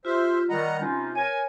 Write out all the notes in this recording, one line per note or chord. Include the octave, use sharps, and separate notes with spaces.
F4 G4 C5 E5
D#3 G3 D#5 F#5 A#5 B5
C3 C#4 D#4 F4
A#4 C#5 G#5